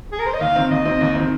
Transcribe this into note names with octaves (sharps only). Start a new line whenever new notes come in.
G#4
A#4
C5
D#5
D#2 F5
D#3 C4
D#2 D#5
D#3 C4
D#2
D#3 C4